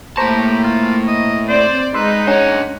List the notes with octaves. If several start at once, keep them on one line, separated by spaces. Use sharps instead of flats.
A2 A#3 G4 C5 A5 A#5 C#6
F4
D#5
C4 C5 D5
G#3 D#4 B4 C6 E6
C#4 D4 C#5 F#5